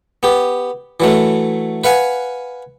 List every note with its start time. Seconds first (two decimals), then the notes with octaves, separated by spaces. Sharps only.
0.23 B3 G4
1.00 E3 F#3 A3
1.84 B4 F5 F#5 G#5